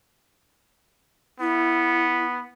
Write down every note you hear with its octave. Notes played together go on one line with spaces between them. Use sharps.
B3 E4